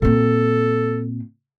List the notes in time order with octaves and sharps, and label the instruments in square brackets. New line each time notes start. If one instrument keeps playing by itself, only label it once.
[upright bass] A#2 C4 [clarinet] A4